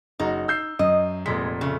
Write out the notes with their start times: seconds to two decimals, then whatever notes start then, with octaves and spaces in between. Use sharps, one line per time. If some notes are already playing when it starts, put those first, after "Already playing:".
0.19 F#1 D#4 F#4
0.48 E6 G6 C7
0.79 F#2 D#5
1.26 F1 A#2 G#3 B6
1.61 C#3 A3